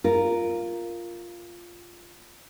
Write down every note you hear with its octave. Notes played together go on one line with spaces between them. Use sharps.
F4 A#4